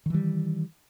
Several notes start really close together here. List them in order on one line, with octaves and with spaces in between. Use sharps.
D#3 E3 G3